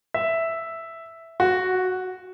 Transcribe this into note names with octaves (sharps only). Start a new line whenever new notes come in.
E5
F#4